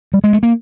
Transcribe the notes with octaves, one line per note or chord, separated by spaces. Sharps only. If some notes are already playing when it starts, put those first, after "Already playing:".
G3
G#3
A3
A#3